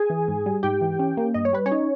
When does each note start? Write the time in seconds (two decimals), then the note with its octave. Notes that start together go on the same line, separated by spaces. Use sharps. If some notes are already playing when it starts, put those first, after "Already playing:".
Already playing: G#4 G#5
0.10 E3
0.28 G#2
0.46 G3
0.63 G#2 G4 G5
0.81 E3
0.99 C#4
1.17 A#3
1.34 G2 D#5
1.45 C#5
1.53 G3 B4
1.66 C#4 C#5
1.71 D#4